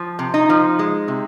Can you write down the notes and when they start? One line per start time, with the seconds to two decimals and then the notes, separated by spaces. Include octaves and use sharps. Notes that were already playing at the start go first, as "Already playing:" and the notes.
Already playing: F3
0.19 C3
0.34 D#4
0.50 F3
0.79 G#3
1.08 C3